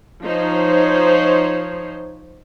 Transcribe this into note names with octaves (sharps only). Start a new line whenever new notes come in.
F3 D#4 C5 C#5